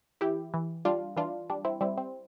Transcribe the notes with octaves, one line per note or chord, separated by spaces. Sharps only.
E3 E4 G4
E3
G3 D4 F4
E3 D4 F4
G3 D4
C4 E4
G3 C4 E4
C4